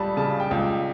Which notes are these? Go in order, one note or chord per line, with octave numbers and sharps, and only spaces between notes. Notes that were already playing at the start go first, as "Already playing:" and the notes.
Already playing: C#2 G3 A5 B5
C#3 A5
G5
C#2